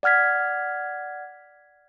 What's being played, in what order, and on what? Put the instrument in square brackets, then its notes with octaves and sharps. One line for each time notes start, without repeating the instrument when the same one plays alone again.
[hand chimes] D5 F#5 F6 G#6 B6